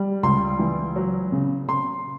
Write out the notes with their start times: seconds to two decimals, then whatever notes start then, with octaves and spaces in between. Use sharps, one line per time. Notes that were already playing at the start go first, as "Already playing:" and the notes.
Already playing: G3
0.23 C#2 C6
0.59 E3
0.95 F#3
1.32 C#3
1.68 C#3 C6